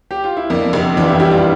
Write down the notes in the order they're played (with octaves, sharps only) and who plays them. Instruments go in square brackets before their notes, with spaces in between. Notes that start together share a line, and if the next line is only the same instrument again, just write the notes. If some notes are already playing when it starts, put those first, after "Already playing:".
[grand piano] G4
F4
E4
[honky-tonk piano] F2 [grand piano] A#3 D4
[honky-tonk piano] F1
[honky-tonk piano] E3 [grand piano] D4 F4
[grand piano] E4 G4
[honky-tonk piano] G3 [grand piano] E4 G4
[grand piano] D4 F4